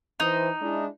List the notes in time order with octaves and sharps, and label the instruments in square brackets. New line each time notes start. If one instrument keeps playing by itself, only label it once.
[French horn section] E3 C5 [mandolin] D#4
[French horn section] G#3 D4 E4